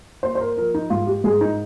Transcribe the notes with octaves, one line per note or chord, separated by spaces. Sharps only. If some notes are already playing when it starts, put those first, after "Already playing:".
A#3 C5
C5
A#4
F3 A#4
D#4
G#2 F4
G4
G#2 G#4
D#4